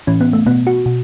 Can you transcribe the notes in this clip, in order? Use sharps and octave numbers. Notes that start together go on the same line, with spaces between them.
A2 E3 C#4
B3
A3
B2 B3
F#4
B2